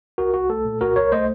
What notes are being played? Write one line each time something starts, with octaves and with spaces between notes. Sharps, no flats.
C2 F#4 A#4
C2 F#4
A3 A4
A#2
C2 F#4 A#4
C2 A#4 C#5
A3 C5 D#5